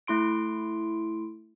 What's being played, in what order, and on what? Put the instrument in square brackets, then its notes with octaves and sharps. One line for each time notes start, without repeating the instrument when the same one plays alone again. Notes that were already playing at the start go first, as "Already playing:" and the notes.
[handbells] A3 E4 C6 D7